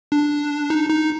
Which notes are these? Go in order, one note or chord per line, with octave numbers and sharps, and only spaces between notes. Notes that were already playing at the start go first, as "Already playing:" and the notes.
D4
D#4
D#4